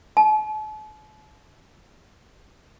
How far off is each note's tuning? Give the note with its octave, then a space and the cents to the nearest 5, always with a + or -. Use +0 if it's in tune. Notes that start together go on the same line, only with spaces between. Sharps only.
A5 -45